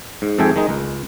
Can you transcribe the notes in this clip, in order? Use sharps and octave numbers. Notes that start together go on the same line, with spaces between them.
G#2
F2 G#2 A4 E5 G5 G#5
D#3 G#3 D#4
C#2